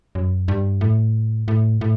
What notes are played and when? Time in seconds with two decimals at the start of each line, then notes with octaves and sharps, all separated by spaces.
0.15 F#2
0.48 G2
0.81 A2
1.48 A2
1.81 A2